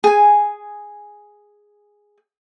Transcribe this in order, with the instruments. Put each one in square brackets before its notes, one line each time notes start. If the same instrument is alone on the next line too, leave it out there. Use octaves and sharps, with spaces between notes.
[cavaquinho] G#4 G#5